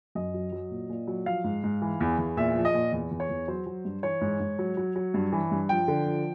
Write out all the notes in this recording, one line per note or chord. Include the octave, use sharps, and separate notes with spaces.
F#2 D#5
F#3
F#3
A#2
A#2
F#3
F3 F5
G#2
G#2
E3
E2
E2
A#2 E5
F3
D#5
A#2
E2
E2
C#5
E2
F#3 C5
F#3
G2
E3 C#5
G#2
G#2
F#3
F#3
F#3
G2
E3
G2
F3 G5
D3
F3